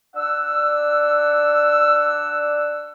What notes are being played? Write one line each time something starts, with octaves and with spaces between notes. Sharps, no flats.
D4 D5 F#5 E6